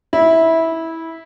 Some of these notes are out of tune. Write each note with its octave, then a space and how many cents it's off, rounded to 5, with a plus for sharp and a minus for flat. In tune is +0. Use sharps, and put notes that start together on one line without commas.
E4 -15